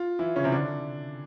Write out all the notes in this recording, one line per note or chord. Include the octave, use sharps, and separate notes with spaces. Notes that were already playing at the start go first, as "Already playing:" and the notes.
Already playing: F4
E3 E4
C#3 C#4
C3 C4
D3 D4